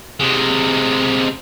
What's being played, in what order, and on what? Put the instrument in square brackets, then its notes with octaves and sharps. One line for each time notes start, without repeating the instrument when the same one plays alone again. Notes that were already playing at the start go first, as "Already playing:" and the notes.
[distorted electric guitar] C3 G#3